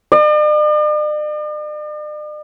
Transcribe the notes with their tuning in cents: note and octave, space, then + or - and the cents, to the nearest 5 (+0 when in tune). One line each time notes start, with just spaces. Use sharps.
D5 +45